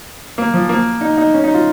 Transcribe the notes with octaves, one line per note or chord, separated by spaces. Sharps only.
A#3
F3
A#3
D#4
D#4
C#4
D#4
F4